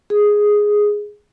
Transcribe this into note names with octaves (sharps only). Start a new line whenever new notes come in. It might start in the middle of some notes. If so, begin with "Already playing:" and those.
G#4